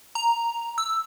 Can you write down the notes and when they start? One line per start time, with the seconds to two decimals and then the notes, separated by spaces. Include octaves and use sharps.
0.15 A#5
0.78 E6